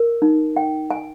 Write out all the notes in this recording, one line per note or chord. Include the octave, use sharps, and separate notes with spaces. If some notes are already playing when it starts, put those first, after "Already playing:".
Already playing: A#4
D#4
G5
G#5